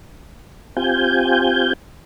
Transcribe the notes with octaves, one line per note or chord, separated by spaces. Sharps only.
C4 F4 G4 G#5 G6